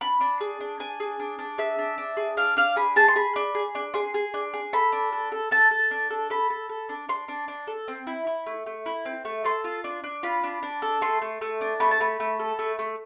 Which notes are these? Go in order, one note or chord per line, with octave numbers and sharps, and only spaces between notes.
D4 B5
D4
G#4
D4
D4 G#5
G#4
D4
D4
G#4 E5
D4
D4
G#4
D4 F5
D4 F5
G#4 B5
G#4 A5
C6
G#4 B5
D4
G#4
D4
G#4 C6
G#4
D4
G#4
A4 B5
D4
A4
A4
A4 A5
A4
D4
A4
A4 B5
A4
A4
D4
D4 C6
D4
D4
A4
C4
E4
E4
A3
A3
E4
C4
A3
A4 C6
F4
D4
D4
F4 B5
D4
D4
A4
A3 C6
A3
A3
D4
A3 B5
A5
A3 B5
A3
A4
A3
A3